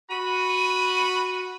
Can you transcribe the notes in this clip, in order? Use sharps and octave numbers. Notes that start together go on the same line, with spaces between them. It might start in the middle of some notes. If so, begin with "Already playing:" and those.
F#4 B5 D#7